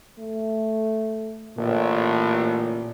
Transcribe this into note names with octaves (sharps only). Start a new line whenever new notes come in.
A3
A1 A#2 D3